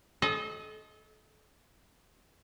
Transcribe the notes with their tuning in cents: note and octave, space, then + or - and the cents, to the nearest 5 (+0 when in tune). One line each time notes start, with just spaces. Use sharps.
A4 -35 D#5 +10